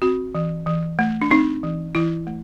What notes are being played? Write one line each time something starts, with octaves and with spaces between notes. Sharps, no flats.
C4 F#4
E3
E3
A3
D4
C4 D#4
E3
E3 E4
A3